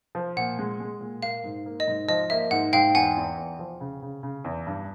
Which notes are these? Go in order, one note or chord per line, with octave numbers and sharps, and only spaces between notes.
F3
A#2 F#5
G#3
G#3
A#2
A#3 F5
G#2
A#3
D#5
G#2
F3 D#5
A#3 E5
G#2 F#5
G#2 F5 G5
E2 F#5 G#5
E2
E2
F3
C#3
C#3
C#3
E2
G2